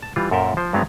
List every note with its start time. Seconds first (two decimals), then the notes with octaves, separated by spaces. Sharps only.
0.03 A5
0.16 E3 G3 F4
0.31 F#2 A#2 A4 A#4 E5 G5
0.57 F3 C5
0.73 G2 F#3 G#3 B3 C4 F5